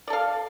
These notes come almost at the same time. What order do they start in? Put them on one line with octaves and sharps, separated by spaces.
D5 A4 F5